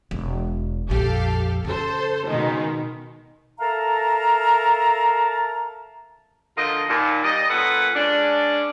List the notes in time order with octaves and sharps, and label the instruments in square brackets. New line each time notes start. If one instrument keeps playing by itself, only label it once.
[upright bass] E1
[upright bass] A#1 F2 [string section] G4 A4 F5
[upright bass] C#3 [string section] A4 C5
[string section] B2 D#3 G#3
[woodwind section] A4 A#4 E5 F5 A5 A#5
[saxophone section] D3 F3 F4 A#4 D#5
D#2 A#2
G3 D5 D#5
A#2 C#4 A4 B4 F#5
G#3 C#4 D4